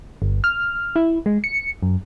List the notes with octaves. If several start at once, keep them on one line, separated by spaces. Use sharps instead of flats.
G1
F6
E4
G#3
C#7
F#2